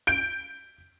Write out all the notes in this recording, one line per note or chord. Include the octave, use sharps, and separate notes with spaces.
G6 D7